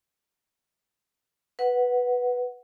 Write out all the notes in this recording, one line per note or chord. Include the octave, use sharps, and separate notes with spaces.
B4 F#5